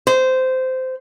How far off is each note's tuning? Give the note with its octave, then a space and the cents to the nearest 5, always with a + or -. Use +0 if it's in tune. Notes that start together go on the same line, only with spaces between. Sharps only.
C5 -15